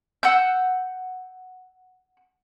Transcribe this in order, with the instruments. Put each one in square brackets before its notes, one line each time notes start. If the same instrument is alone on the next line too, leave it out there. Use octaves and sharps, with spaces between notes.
[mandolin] F#5 E6 G6